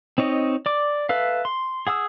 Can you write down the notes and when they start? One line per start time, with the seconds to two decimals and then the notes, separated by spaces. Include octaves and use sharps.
0.18 C4 D#4 C#5 D#5
0.66 D5 D6
1.09 A4 B4 E5 F5
1.45 C6
1.87 G#4 F#5 D#6 E6